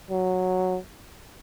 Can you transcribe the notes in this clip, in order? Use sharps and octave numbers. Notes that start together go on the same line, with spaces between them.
F#3